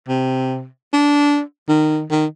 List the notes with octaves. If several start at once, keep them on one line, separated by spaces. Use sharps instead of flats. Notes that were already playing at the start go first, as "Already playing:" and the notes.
C3
D4
D#3
D#3